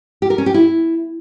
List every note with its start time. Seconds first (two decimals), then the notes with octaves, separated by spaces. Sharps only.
0.22 G4
0.30 A#4
0.38 C#4
0.46 G4
0.54 E4